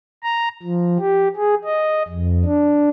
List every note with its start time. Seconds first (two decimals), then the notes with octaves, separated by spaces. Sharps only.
0.23 A#5
0.63 F3
0.99 G4
1.36 G#4
1.65 D#5
2.08 F2
2.45 D4